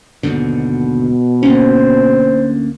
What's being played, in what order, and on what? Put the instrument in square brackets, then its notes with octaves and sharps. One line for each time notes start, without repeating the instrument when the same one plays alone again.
[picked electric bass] D#2 G#2 D3 [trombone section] B2
[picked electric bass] D2 A#3 C#4 [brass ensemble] C5